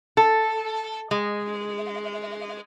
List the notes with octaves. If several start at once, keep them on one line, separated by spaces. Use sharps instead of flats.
A4
G#3